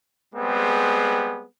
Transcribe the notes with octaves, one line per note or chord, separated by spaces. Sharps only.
G3 G#3 B3 C4 G#4